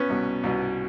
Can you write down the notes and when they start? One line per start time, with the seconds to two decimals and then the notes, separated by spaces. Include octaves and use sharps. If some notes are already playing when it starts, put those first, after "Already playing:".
Already playing: B3 C#4
0.09 C2 B2
0.43 C2 B2